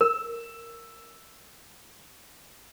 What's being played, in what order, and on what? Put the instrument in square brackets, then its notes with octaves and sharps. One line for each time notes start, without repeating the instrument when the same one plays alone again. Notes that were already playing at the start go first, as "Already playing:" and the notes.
[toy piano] A#4 [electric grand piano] E6